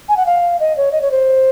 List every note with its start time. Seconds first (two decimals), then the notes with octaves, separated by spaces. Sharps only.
0.09 G#5
0.17 F#5
0.26 F5
0.60 D#5
0.77 C#5
0.92 D#5
1.02 C#5
1.11 C5